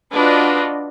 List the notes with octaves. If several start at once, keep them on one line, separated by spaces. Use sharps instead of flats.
D4 F4 F#4 B4 D#5